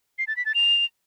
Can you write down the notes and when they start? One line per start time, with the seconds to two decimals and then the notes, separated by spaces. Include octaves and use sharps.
0.18 C7
0.27 A6
0.36 B6
0.45 A6
0.54 F7